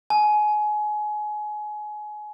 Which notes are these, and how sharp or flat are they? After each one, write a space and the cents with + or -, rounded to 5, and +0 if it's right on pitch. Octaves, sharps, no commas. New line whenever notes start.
G#5 +25